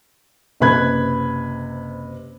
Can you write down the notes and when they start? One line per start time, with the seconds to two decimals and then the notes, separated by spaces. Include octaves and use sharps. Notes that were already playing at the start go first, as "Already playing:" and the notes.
0.60 F#1 C3 B4 B5 F#6 G#6